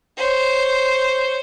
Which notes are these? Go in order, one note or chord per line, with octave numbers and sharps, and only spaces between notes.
C5 C#5